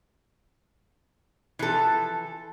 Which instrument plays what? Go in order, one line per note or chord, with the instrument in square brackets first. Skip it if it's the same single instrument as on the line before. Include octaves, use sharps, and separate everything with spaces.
[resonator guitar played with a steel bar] E3 F3 A4